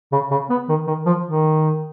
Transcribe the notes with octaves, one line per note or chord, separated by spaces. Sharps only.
C#3
C#3
B3
D#3
D#3
F3
D#3